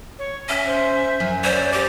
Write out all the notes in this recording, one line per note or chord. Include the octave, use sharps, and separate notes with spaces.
C#5
C#4 E5
C5
F#2 G#5
C#4 C5 D5
G4 D6